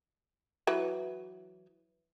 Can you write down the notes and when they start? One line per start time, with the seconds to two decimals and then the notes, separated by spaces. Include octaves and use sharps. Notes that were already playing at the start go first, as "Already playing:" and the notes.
0.67 E3 F#3 B4